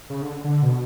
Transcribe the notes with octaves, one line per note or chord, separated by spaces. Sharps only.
C#3
D3
D3
B2